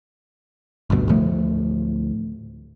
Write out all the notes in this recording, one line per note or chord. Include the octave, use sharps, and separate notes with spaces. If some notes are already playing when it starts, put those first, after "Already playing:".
G#1 D2 G2 B2
D2 A2 F3 A3